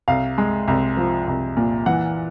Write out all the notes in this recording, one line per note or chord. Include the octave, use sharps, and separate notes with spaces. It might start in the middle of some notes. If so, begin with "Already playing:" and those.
C2 F5
G#3
C2
F3
C2
A#2
E3 F#5